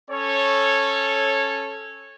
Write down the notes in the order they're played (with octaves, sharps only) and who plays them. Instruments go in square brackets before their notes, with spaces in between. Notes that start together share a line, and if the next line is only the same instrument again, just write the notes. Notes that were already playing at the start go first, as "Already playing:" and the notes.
[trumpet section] C#4 A4 C#5